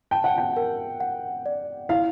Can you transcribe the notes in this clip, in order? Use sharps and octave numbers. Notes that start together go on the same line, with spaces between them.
G5 A5
F#5
G5
A#4
F#5
D5
E4 F5